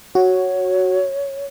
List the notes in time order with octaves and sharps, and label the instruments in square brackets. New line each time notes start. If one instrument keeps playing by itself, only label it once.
[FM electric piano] F#4 [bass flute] C#5